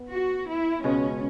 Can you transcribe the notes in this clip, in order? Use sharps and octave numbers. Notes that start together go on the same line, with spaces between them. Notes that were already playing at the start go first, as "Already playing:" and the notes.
Already playing: B3
F#4
E4
C#2 B2 G#3 C#4